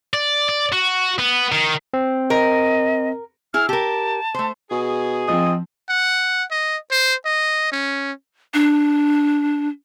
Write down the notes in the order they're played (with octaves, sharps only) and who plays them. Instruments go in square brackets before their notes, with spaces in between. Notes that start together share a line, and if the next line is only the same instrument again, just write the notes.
[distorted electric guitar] D5
D5
F#4
B3
D#3
[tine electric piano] C4
[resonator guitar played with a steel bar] A#4 [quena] D#5
[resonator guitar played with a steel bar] E4 G#4 [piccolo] F6
[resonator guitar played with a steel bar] G4 A#4 [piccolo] A5
[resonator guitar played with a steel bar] A3 C5
[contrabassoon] B2 [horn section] G#4
[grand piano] F3 C4 [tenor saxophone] D#5
[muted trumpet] F#5
D#5
C5
D#5
C#4
[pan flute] D4